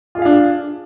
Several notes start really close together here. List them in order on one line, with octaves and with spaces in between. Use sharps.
F4 G#4 F5 D4